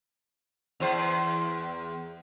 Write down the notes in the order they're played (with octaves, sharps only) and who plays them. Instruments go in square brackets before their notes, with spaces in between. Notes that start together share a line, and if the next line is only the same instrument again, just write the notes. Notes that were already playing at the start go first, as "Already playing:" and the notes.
[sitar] E2 C5